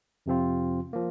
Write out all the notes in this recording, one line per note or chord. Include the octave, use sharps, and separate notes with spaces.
F2 C3 F3 C4 F4
F3 A#3